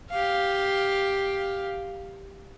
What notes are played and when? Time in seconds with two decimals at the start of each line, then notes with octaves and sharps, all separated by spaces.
0.10 G4 F5